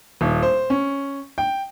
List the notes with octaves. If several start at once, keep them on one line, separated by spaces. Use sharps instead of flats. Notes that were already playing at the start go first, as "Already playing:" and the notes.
D#1
C5
C#4
G5